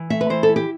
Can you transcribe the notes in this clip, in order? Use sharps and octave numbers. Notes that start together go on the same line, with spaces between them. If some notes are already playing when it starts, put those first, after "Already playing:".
Already playing: E3
A3 E5
B4
E3 C5
A4
E4
G4